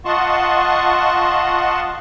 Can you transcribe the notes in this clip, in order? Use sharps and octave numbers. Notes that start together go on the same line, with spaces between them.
F4 D#5 F#5 A5 C6 C#6